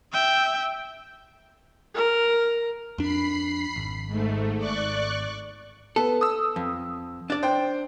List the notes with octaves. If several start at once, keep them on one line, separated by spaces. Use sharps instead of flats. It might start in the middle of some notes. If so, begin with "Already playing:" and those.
E5 G5
A#4
F2 D4 B5 C7
G#1
G#2 A3
D5 C#6 F#6
B3 A4
D#6 E6
F2
D4 D5
C5 G5